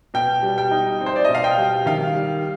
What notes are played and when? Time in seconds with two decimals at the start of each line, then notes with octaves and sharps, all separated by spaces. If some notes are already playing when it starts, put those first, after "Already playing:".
0.14 B2 G5
0.43 G3
0.58 G5
0.71 D#4
1.01 C4
1.06 C5
1.16 D5
1.25 B2 D#5
1.35 F5
1.44 G5
1.58 G3
1.86 D#3 F5
2.15 G3